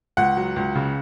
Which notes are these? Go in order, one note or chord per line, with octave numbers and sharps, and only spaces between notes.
C#2 F#5
F#3
C#2
C#3